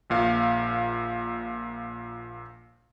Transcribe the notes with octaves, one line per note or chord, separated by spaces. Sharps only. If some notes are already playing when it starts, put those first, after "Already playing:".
A#1 A#2 F5